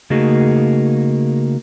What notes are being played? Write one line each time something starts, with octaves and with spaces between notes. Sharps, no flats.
C#3 A3 A#3 D#4 F#4 G#4